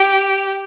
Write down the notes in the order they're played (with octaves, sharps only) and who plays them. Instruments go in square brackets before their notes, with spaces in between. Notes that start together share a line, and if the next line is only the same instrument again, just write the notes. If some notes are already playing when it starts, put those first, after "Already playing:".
Already playing: [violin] G4